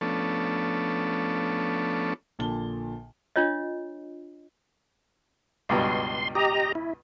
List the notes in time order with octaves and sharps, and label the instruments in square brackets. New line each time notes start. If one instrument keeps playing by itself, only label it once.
[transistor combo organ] F3 A3 B3 C#4 D4 A4
[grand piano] A#1 A#2 D3 A5 G7
[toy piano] D4 F4 C#5 D#5
[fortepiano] C#2 G2 B2 [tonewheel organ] C6
[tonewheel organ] G4 D#5 A#5
E4